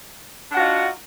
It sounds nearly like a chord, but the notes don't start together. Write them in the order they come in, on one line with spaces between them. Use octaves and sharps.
D4 F#5 F#4 F4 D#4